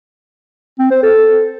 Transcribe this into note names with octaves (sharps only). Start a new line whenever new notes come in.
C4
C5
A4